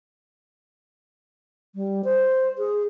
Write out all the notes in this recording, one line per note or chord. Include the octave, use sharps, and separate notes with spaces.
G3
C5
G#4